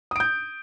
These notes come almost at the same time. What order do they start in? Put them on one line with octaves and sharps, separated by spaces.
D#6 D7 G6